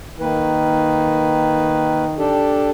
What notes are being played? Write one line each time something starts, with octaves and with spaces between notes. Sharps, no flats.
D#3 A#3 B4
D4 G4 A4